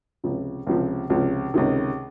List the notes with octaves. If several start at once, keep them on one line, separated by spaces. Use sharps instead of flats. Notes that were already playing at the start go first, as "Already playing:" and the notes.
C#2 C3 F3
C#2 C3 F3
C#2 C3 F3
C#2 C3 D#3